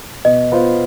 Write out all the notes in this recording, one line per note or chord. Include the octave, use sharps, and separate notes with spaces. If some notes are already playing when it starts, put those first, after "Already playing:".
B2 D#5
B3 F4 C5